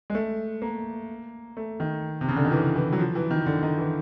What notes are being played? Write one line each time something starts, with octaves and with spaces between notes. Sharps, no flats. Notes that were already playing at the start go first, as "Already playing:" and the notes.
G#3
A3
A#3
A3
D#3
C3
C#3
D3
D#3
E3
E3
F#3
F3
E3
D#3
D3
D#3
E3